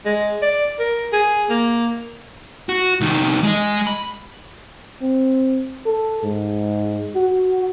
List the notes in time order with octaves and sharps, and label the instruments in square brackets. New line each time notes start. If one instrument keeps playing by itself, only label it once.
[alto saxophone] G#3
D5
A#4
G#4
A#3
[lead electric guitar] F#4
C2 D#3
G#3 D#5
B5
[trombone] C4
A4
G#2
F#4